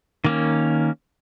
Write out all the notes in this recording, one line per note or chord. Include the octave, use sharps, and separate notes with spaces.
D#3 A#3 C#4